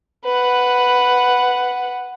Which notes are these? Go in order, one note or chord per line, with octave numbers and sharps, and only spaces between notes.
B4 F#5